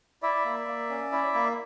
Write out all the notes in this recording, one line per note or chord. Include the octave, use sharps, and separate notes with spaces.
E4 D5 E5
A#3
A#3
C#4
E4
A#3